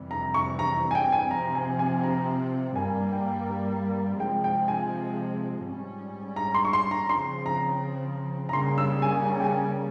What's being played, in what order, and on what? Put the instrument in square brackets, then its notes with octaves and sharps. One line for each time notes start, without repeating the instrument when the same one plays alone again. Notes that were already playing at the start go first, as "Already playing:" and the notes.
Already playing: [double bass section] F2 C3 E3 G3
[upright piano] A#5
C#6
A#5
G#5
G5
G#5
[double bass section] C3 F3 C4 [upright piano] A#5
[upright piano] G#5
G#5
A#5
[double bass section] G2 G3 A#3 [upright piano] G#5
[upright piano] G5
[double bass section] C3 F3 G#3 C4 [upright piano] G5
[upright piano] G5
G#5
[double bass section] G#2 G3 C#4
[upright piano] A#5
C6
C#6
C6
A#5
[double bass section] C#3 F3 C4 [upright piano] C6
[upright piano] A#5
A#5
[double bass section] C#3 G3 A#3 C#4 [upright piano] C6
[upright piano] E6
G#5
G#5
G5
G#5